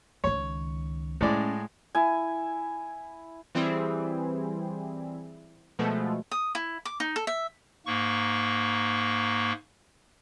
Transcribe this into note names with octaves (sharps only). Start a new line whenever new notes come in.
C#2 D#3 C#5
A2 G#3 C#4 D5
E4 G#5
E3 G3 C4 E4 G#4
B2 F3 G#3 A3
D#6
E4
D6
D#4
A4
E5
G#2 A#3 C#6